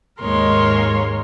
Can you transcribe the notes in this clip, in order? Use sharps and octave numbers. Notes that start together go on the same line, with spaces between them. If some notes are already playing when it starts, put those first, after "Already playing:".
D#2 G#2 G#3 A#4 C#5 C6